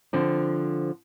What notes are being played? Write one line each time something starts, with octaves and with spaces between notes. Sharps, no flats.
D3 F3 C4